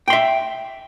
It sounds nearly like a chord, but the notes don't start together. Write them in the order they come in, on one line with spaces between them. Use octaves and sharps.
G5 C6 E5